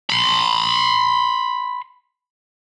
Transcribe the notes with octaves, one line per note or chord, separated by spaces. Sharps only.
B5 C6